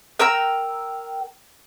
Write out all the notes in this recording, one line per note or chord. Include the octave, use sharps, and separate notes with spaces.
A#4 G5 A#5 E6